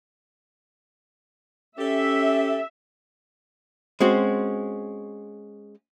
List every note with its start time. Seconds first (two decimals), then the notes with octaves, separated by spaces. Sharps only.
1.79 C#4 G4 A4 E5
4.00 G#3 C4 C#4 F#4